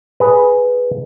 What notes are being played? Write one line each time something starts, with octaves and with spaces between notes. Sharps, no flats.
G#4 B4